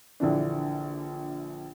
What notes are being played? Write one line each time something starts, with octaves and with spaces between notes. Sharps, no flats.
A#1 D3 E3 D4